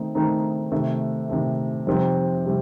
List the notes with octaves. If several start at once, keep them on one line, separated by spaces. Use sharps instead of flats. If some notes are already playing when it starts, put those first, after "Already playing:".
Already playing: D#3 A3 C4 D#4
D#3 A3 C4 D#4
C3 D#3 A3
C3 D#3 A3
F2 C3 G3 C4 D#4
C3 G3